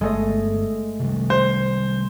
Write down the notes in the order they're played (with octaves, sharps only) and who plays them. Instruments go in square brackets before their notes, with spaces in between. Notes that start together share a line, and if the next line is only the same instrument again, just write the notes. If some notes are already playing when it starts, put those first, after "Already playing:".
[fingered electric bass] G1 [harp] G#3 A3 D#5
[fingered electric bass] C3 D#3 G3
[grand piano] C5